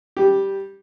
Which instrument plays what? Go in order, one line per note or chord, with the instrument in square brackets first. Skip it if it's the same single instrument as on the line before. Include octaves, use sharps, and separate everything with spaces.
[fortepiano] G3 G4